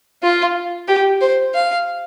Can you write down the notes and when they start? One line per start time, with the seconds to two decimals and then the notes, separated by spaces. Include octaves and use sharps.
0.23 F4
0.88 G4
1.21 C5
1.54 F5